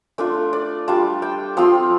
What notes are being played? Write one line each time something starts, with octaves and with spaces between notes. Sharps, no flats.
A3 D4 F4 D5
D5
G3 D4 F4 A5
G5
F3 C4 F4 C6